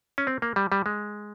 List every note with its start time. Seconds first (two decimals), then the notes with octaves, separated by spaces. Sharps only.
0.18 C#4
0.27 C4
0.42 A#3
0.56 G3
0.72 G3
0.86 G#3